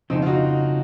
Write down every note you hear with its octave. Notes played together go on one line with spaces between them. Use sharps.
F2 C#3 F3 C4 D#4
F4
D#4 F#4